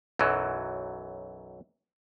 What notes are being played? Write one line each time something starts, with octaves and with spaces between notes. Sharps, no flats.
B1 F#2 E3 F#3